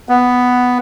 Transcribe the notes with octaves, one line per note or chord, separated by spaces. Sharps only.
B3